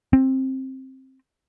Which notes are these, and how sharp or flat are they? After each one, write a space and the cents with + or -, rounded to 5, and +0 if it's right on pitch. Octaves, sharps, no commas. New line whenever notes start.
C4 +15